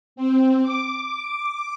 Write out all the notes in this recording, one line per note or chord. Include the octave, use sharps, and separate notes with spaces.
C4
D6